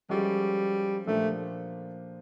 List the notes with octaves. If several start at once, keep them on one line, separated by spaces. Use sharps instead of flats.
F3 G3 G#3 C#4 F#4 A4
A#2 F3 A3 A#3 D4 G4